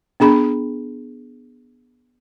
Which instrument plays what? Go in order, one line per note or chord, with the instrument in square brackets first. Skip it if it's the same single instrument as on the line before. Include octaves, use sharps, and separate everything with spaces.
[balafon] B3 D4 G#4 B5